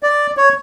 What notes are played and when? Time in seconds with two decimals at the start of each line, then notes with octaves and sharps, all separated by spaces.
0.03 D5
0.37 C#5